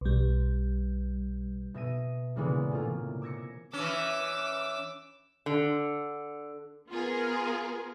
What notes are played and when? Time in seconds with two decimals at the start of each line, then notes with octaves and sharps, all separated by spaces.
0.01 B1 G3
1.74 B2 E5 A#6 D#7
2.36 D2 A#2 C#3 E3 G#3 B3
2.71 A2 C3 A#3 F4
3.22 D6 E6 G#6 A#6 C#7
3.73 E3 C#4 D6 E6
5.46 D3
6.89 B3 F4 G#4 A#4